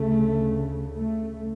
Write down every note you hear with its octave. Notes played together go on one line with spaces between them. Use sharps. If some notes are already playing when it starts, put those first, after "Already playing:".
Already playing: D2 C#3 A3
A3